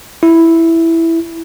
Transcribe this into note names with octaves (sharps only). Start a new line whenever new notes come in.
E4